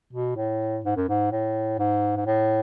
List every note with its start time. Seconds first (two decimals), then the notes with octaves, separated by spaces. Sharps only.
0.13 B2
0.37 A2
0.85 G#2
0.97 F#2
1.09 G#2
1.32 A2
1.79 G#2
2.17 G#2
2.26 A2